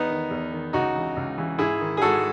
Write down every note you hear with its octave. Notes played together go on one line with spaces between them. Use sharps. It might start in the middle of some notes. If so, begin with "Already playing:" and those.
Already playing: E2 B3 D#4
D#3
E2
D#3
C#2 D#4 F#4
C#3 E3
C#2
C#3 E3
G#2 E4 G#4
D#3
G#4
G#2 F#4 A4